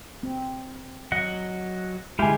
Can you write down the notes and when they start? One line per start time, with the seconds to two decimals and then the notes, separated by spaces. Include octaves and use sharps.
0.23 C4
1.12 F#3 D#5 F#5
2.19 D3 G#3 E4 F4 G4 E5 G#5